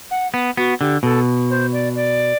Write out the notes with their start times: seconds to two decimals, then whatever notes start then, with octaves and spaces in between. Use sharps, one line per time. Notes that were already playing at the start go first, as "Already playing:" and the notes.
0.11 F#5
0.34 B3
0.57 B3 F#4
0.80 D3 G4
1.03 B2 A4
1.50 C5
1.72 D5
1.96 D5